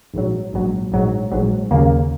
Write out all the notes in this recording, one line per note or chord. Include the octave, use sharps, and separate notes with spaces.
A#1 G#2 F#3
A#1 G#2 F#3
A#1 G#2 F#3
A#1 G#2 F#3
D#2 C#3 A#3